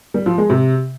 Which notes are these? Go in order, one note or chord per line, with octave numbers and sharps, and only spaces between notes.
G3
F3
G#3
C3